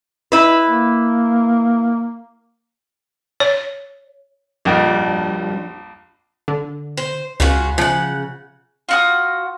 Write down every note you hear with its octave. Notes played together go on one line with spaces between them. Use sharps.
E4 B4
A#3
C#5
A#1 F2 F3 G3 D4
D3
C5
C#2 C#3 F4 F#4
C#3 F3 F#5
F4 F#4 D#6